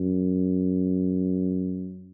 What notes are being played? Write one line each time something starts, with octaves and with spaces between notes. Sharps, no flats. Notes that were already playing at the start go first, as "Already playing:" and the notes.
Already playing: F#2